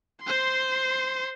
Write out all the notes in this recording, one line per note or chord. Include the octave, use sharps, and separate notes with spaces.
C5 C6